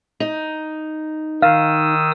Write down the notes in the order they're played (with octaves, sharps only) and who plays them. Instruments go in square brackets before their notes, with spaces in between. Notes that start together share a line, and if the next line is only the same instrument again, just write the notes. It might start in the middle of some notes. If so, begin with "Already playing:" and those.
[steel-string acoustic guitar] D#4
[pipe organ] D#3 D#6 E6 [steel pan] F5